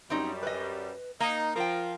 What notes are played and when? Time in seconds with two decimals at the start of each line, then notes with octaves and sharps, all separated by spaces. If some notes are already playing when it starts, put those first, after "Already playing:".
0.10 F#2 G3 C4 C#4 D#4
0.43 B4 D#5
1.20 A#3 D#4
1.56 F3 F4 A#4 G5